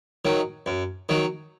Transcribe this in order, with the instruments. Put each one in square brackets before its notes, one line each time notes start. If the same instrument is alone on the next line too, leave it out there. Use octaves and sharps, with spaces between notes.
[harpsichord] D#3 F#3
F#2
D#3 F#3